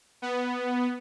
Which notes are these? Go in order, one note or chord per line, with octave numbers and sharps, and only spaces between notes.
B3